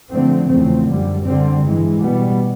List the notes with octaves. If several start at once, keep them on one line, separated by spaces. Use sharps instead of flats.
D3 F3 A3 C4
E2 C#3 F3 A3 C4
F#2 D3 G3
D3 G3 C4
G2 E3 G#3
B2 G3 B3